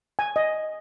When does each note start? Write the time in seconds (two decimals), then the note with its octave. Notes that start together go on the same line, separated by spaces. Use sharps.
0.19 G#5
0.36 D#5